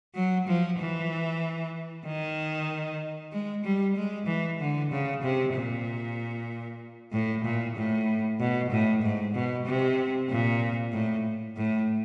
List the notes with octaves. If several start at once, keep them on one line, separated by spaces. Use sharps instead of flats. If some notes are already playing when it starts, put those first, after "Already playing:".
F#3
F3
E3
D#3
G#3
G3
G#3
E3
D3
C#3
C3
A#2
A2
A#2
A2
B2
A2
G#2
B2
C3
A#2
A2
A2